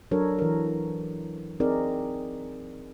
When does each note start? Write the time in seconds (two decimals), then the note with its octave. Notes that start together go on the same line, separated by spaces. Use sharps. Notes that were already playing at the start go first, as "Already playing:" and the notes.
0.11 F#3 D4 A4 A#4 C#5
0.39 E3 A#4
1.60 C4 D#4 G#4 A#4 D5